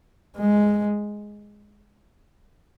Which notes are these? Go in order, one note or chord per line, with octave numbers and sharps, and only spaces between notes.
G#3